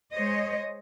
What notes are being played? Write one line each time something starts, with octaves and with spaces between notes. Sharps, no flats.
G#3 C5 C#5 D#5